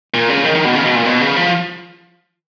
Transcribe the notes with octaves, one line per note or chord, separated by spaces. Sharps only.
A#2
C#3
D#3
D#3
B2
C#3
B2
A#2
B2
C#3
F3